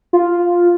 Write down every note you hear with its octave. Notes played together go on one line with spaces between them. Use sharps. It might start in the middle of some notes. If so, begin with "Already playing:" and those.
F4